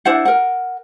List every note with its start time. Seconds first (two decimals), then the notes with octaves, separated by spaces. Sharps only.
0.05 D4 E4 C5 F#5
0.25 A#4 F#5